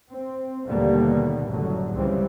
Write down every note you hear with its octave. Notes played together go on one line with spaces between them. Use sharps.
C4
D#2 B2 D3 G3 A3 A#3
F#1 A2 D3 F#3
C#2 C#3 E3 G3 C4